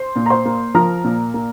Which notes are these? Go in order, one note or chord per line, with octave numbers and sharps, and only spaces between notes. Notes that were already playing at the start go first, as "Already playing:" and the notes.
Already playing: C5 C6
A#2
A#5
C5 C6
A#3
F3 A#4 A#5
A#2
A#3